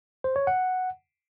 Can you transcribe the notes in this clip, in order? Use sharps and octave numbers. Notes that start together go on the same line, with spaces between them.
C5
C#5
F#5